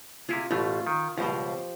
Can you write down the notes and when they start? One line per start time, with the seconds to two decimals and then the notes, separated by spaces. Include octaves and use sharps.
0.29 C3 E4 F4 G#4
0.51 A1 B2 A3 F4
0.87 D#3
1.18 C#2 G2 B2 F3 G4 C5